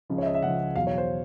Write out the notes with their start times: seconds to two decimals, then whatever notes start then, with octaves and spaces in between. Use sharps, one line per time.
0.09 C#2 C#3 F3
0.18 C#5
0.22 E5
0.26 D#5
0.34 E5
0.42 C#2 C#3 F3 F#5
0.76 E2 B2 F#3 F5
0.87 C#5
0.98 C5